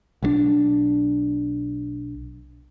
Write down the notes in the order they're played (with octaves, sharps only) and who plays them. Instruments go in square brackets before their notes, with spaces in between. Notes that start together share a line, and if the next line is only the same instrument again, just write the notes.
[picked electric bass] B1 G3 D4